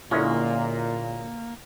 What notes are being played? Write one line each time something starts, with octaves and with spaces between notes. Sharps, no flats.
F#2 A#2 D3 G#3 A#3 C#4 E4